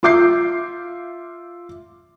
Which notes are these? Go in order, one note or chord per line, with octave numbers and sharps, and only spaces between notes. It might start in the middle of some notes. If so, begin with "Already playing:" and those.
F4 E5 D6 G6 C7